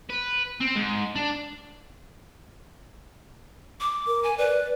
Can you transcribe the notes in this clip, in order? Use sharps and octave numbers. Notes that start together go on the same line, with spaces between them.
B4
C4
G#2
D4
D6
A#4
G#5
B4 D5